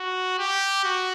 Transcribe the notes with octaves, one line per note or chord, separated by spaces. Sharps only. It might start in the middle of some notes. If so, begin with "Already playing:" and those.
Already playing: F#4
G4
F#4